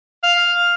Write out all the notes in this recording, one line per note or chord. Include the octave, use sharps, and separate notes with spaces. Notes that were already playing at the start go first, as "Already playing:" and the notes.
F5